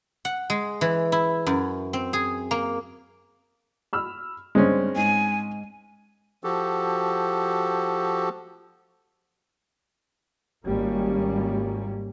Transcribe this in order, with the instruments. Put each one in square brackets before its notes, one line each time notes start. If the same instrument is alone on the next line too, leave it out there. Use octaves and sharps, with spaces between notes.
[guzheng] F#5
G#3
E3
E4
F#2
C4
G#4
A#3
[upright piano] B5 E6 F6
[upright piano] G2 [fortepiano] G#3 C4 C#4
[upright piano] G#2 [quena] G#5
[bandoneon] F3 F#4 G4 A4
[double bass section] G#1 G3 A#3 C#4